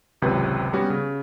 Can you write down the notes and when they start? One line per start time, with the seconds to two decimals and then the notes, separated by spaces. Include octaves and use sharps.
0.22 G#1 C#2 C3 F#3 B4
0.73 G3 B3 C#4 F#4 G4
0.90 C#3